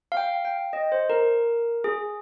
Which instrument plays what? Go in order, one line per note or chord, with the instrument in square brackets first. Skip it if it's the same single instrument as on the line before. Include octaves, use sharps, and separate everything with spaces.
[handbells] F5
G5
G5
D#5
C5
A#4
G#4